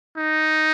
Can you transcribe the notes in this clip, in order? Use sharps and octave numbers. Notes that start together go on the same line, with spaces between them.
D#4